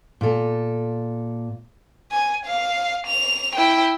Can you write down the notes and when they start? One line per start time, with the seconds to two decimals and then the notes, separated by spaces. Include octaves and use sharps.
0.21 A#2 A4
2.12 G#5
2.45 F5
3.07 F7
3.55 E4 G5